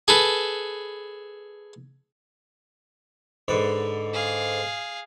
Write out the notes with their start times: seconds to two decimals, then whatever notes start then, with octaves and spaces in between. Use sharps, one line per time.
0.08 G#4 A4 B4
3.48 G#2 D3 B4
4.13 G#4 F5